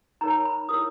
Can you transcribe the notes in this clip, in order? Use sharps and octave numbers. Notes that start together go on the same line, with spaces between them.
D#4 A#4 C#5 A#5
B5
E4 A#4 C#5 D#6